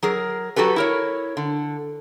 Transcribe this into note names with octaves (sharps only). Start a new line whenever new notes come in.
F#3 G#4 A#4
F#3 F#4 G4 A4 B4
E4 A#4 C#5
D3